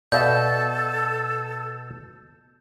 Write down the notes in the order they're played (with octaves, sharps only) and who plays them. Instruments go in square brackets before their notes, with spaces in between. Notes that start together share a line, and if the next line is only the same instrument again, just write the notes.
[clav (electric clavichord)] B2 [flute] A4 [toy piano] D5 E5 F5 [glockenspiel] G6